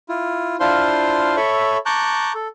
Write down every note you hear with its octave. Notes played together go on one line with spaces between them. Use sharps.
E4 F4
D4 E4 F4 C5 F5 C6
A4 C#5 E5 B5 C#6
A5 A#5 C#6 D6 F#6 G6
A4